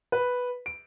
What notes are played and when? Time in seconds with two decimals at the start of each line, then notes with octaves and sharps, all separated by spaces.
0.12 B4
0.66 D7